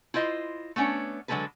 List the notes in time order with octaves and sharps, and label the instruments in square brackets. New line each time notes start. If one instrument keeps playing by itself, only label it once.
[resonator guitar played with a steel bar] E4 F4 C5 D#5
A3 B3 C#4 D4 C#5
D3 F#3 G#3 A#3 A4 B4